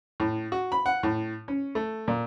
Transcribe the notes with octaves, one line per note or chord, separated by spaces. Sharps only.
A2
F#4
B5
F#5
A2
C#4
A3
A#2